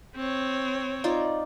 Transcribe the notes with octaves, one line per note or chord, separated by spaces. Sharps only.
C4 C#5
D#4 F4 D5